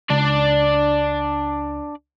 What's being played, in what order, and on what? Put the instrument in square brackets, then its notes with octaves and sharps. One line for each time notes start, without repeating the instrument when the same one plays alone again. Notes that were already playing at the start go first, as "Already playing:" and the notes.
[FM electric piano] C#2 [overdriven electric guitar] D4 D5